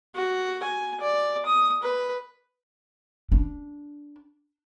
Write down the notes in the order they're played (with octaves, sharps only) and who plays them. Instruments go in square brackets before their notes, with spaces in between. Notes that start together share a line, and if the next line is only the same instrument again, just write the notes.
[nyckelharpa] F#4
G#5
D5
D#6
B4
[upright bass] D4